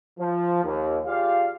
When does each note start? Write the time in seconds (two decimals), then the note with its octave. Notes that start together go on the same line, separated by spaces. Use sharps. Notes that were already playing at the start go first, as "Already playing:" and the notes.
0.19 F3
0.64 D#2
1.06 F4 G4 G#4 D5 F5